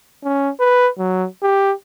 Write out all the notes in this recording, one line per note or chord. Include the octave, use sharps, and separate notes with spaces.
C#4
B4
F#3
G4